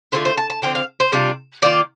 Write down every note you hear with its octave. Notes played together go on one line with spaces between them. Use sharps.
D3 A3 D4 F4 C5
C5
A5
A5
D3 F3 C4 G5
F5
C5
C3 G3 D4 F4
D#3 A#3 F4 D5